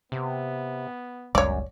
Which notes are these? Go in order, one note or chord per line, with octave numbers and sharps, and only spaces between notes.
C3 B3
G1 C#2 F#2 G3 C#5 D5